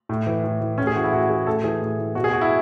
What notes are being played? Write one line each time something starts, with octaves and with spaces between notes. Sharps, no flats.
A2
E3
A2
E3
A2 C#4
G#4
E3 F#4
E4
A2 F#4
E3 G#4
A2 A4
E3 G#4
A2
E3
B2 F#4
G#4
F#4
E4